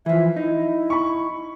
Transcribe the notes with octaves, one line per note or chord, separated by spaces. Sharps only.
E3 F3 E5
D#4 E4
B5 C#6